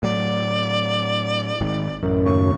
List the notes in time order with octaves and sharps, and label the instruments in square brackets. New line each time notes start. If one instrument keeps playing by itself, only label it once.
[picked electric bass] A2 F#3 [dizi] D5
[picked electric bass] G#1 G#2 D#3
[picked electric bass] A1 [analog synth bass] F#2
[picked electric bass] D#2 A2 C#3 [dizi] C#6